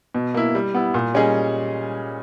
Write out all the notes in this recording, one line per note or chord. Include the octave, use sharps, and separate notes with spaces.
B2
A#3 E4
G3
B3 E4
A#2
G3 C#4 G#4 D#5